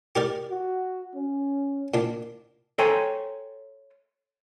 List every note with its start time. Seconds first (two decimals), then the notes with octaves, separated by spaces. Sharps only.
0.16 G4 A#4 D5
0.50 F#4
1.15 C#4
1.94 A#2 D4
2.78 A4 C5 C#5 G5 G#5 A#5